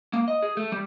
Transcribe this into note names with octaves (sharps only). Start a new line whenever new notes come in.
A#3
D#5
G#4
A3
G3